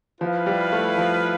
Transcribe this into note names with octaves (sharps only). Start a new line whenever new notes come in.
F3 E4 B4 F5
G3
A3
F3